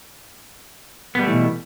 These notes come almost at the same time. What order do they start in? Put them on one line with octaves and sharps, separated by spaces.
B3 G3 A3 E3 B2